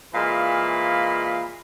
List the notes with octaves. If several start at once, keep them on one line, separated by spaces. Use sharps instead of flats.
A#2 E3 G#3 F5 B5